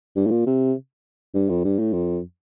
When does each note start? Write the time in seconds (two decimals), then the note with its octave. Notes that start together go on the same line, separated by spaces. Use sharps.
0.16 G2
0.27 A2
0.31 A#2
0.47 C3
1.35 G2
1.50 F2
1.64 G2
1.79 A2
1.93 F2